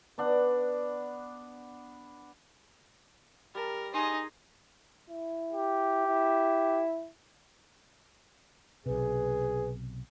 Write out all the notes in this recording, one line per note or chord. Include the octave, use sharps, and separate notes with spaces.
B3 D4 F#5
G3 A#4 A5
D#4 G#4 D#5 G#5 C6
E4
G4
E4
B1 C3 G#4 B4